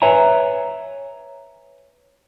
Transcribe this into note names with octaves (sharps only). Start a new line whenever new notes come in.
B4 C#5 E5 G#5 A#5